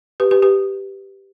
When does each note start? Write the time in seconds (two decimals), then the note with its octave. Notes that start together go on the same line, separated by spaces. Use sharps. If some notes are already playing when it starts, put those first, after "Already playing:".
0.20 G4 B4
0.31 G4 B4
0.43 G4 B4